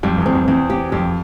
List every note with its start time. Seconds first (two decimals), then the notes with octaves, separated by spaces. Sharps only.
0.03 F2 G3
0.18 E2
0.26 C4
0.33 F2
0.48 E2 C4
0.70 G4
0.92 F2 G4